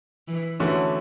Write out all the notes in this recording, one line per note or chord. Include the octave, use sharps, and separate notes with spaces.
E3
D3 E3 A3 C#4 F#4